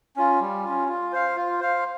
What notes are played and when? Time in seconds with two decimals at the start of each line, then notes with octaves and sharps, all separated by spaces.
0.16 C#4 F4
0.40 G3
0.64 C#4 F4
0.88 F4
1.13 C5 F5
1.36 F4
1.60 C5 F5